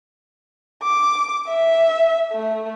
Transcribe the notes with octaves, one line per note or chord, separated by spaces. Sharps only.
D6
E5
A3